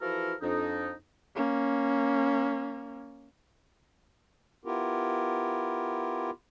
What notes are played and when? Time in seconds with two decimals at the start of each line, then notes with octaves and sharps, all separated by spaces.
0.02 E3 F3 E4 F#4 A4 A#4
0.42 F2 D4 D#4
1.36 A#3 C#4
4.65 B3 E4 F4 G4 A#4